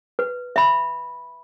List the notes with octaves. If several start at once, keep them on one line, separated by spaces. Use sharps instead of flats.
B4
E5 B5